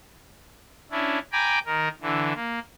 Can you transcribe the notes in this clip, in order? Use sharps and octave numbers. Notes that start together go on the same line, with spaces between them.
C#4 D4 E4
G5 G#5 A#5 B5 D6
D#3 A#4
D3 E3
A#3